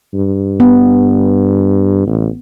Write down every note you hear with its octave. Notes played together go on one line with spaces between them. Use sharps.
G2
B3
A1